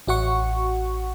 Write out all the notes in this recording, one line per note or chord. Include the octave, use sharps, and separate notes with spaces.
A1 F#4 F#5 C#6